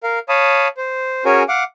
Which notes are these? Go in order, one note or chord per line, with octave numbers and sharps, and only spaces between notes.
A#4 F5
C#5 F5 A5 B5 D#6
C5
C#4 F#4 G#4 A#4 C#5 G#5
F5 F#5 D6